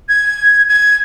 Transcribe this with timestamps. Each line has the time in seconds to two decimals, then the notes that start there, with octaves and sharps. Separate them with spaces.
0.09 G#6
0.69 G#6